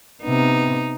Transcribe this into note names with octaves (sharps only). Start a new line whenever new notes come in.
C3 B3 D#4